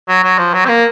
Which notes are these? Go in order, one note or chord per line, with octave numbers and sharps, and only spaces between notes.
F#3
F#3
F3
F#3
C4
A#3